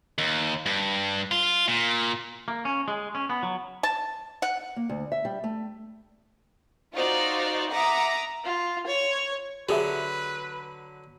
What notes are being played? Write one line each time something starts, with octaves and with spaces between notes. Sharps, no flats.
D#2
G2
F4
A#2
A#3
C#4
G#3
C#4
B3
F#3
A5
F#5
A#3
D2
E5
G3
A3
D#4 F4 F#4 C5 D5
E5 F#5 A#5 D6 D#6
F4
C#5
D3 F#3 G4 G#4 B4 E5